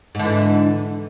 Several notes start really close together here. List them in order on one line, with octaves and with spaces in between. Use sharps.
G#2 D3 E3